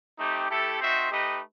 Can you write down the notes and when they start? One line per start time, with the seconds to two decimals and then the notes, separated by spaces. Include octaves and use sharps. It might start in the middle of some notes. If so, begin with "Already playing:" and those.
0.19 A3 C4 D#4 G4
0.50 A3 E4 G4 A4
0.81 C4 D#4 F#4 C5 E5
1.11 A3 D#4 G4 B4 D#5